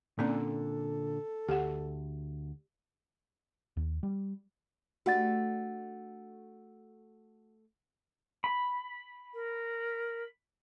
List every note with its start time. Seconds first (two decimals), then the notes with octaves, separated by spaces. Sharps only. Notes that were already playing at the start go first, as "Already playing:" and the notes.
0.19 A#2 D3 A#3 C4 C#4 A4
1.49 D2 G4 F#5
3.77 D#2
4.03 G3
5.06 A3 D4 F#4 G4 F#5 A6
8.44 B5
9.34 A#4